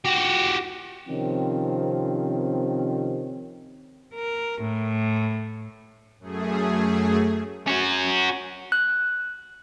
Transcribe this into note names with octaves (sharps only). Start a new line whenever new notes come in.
F#4 G4
C3 D#3 F3 C4 C#4
A#4
A2
F#2 A3 G#4
C#4 F#4
F#6